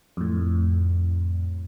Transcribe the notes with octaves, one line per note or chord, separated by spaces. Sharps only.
F2 A2